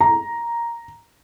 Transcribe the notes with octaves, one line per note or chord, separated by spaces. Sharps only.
A#5